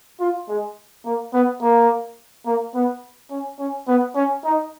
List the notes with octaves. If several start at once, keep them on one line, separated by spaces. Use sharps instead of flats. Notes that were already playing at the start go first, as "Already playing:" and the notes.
F4
G#3
A#3
B3
A#3
A#3
B3
C#4
C#4
B3
C#4
D#4